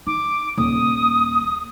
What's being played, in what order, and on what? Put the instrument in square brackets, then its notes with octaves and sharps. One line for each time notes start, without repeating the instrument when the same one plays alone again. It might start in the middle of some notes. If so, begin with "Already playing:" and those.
[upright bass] D#4 [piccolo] D6
[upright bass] D#1 [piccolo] D#6